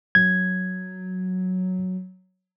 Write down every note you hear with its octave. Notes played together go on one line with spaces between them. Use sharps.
F#3 G#6